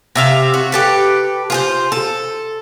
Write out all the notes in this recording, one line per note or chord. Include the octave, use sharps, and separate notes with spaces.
C3 E5 F5
F#4
G4 A4 B4
F4 G#4 C5
A4